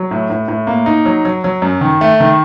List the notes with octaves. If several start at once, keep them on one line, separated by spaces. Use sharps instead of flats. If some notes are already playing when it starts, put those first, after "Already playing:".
Already playing: F#3
A2
A2
A2
A#3
D#4
F#3
F#3
F#3
F#2
D#3
A3
D#3